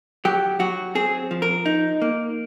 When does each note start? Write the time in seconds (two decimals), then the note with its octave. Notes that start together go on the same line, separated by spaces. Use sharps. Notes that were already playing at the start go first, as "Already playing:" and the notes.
0.25 F#3 G4
0.60 F#3 F#4
0.95 C4 G#4
1.31 F3
1.42 A#4
1.66 D#4
2.02 A#3